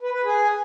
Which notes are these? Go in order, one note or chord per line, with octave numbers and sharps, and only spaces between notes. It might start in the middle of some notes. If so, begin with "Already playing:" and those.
B4
B4
G#4